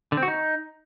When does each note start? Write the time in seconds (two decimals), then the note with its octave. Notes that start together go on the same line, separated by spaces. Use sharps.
0.12 D3
0.17 C4
0.23 F#4
0.28 D#4